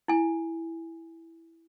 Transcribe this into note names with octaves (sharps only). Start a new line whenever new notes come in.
E4 G#5